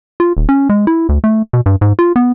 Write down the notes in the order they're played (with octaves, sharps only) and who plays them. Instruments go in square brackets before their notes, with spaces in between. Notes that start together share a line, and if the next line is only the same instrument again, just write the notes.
[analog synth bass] F4
D#1
C#4
G#3
E4
D2
A3
B2
G2
G#2
F4
B3